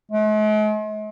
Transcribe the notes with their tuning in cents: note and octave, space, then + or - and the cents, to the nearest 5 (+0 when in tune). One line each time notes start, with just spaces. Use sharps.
G#3 +45